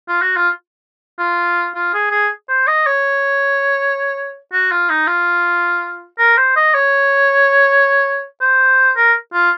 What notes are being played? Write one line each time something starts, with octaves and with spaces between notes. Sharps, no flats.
F4
F#4
F4
F4
F4
G#4
G#4
C5
D#5
C#5
F#4
F4
D#4
F4
A#4
C5
D#5
C#5
C5
A#4
F4